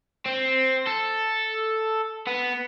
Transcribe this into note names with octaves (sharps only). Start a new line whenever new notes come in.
C4
A4
B3